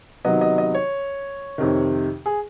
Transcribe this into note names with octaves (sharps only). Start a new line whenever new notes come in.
C3 D#3 F#3 B3 D#5
D#5
D#5
C#5
F2 C3 D#3
G#4